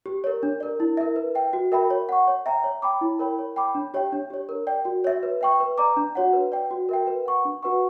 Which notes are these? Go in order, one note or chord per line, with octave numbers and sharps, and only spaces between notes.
G4
A#4 C#5
D4
A#4 D5
E4
A#4 E5
B4
E5 G5
F#4
A#4 E5 G5 B5
C#5
F#5 C#6
C#5
E5 G5 A#5
C#5
G5 B5 D6
E4
A#4 C#5 G5 B5
C#5
G5 B5 D6
D4
G4 C#5 E5 G5
D4
G4 C#5
A#4
D5 G5
F#4
C#5 E5
B4
E5 G5 C#6
B4
D5 A#5 D6
D4
F#4 C#5 F#5
B4
D5 G5
F#4
A#4 E5 G5
B4
F#5 C#6
D4
F#4 B4 F#5 C#6